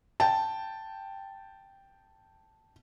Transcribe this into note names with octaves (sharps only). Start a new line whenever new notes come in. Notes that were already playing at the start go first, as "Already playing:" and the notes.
G5 A5